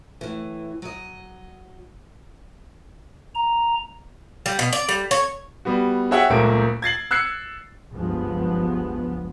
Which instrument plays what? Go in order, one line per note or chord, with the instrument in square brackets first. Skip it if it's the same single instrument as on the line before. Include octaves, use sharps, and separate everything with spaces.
[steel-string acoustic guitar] A2 E3
F#3 D#5
[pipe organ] A#5
[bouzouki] G3
B2
D5
G3
C#5
[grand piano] G3 B3 F#4
F#4 G#4 C#5 E5 F#5 G5
F#1 C#2 A#2 A3 A#3 D7
G#6 A6 C7 F#7
E6 F#6 G#6 C7 C#7
[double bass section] F#1 C#2 G2 F3 G#3 B3